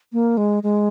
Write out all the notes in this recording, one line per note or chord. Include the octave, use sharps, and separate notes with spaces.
A#3
G#3
G#3